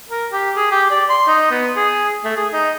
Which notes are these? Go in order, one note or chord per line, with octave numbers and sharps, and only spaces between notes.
A#4
G4
G#4
G4
D5
C6
D#4
B3
G#4
A3
G#4
D#4